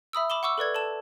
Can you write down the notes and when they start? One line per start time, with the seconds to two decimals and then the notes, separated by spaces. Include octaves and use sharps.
0.13 E5 B5 D#6 E6
0.30 B5 D6 E7 G7
0.43 F#5 C#6 D6 E6
0.58 A4 B4 D5 G#6
0.75 A4 A5 E7